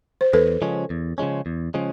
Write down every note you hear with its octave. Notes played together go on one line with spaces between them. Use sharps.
C5
E2 A4 B4
C#3 F3 G#3 C#4
E2
C#3 F3 G#3 C#4
E2
C#3 F3 G#3 C#4